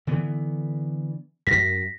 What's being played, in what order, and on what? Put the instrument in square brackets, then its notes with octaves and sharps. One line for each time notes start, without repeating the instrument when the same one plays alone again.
[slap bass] D3 E3 B3
[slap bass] F#2 [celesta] A#6 B6